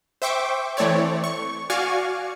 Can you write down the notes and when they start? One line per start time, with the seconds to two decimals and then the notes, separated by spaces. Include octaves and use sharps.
0.22 C5 E5 G5 C#6 D6
0.77 E3 A3 C4 C#5 D5
1.24 C#6
1.70 F#4 D5 F5 G#5 C#6 F6